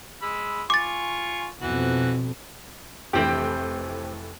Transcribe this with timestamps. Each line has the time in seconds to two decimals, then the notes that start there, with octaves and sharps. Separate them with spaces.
0.22 G#3 B5 E6
0.70 F4 G#5 C#6 D6 A6
1.61 F2 B2 E3 F#4
3.13 F1 E3 A3 C4 G4